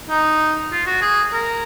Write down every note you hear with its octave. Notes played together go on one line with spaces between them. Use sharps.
D#4
F4
F#4
G#4
A#4